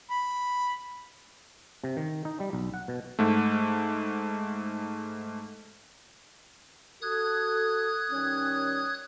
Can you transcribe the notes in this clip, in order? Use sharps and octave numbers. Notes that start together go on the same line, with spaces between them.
B5
C3
D#3
D#4
G3
B1
F#5
B2
G#2 A3
F#4 A4 D#6 F#6 G#6
D#3 G3 C#4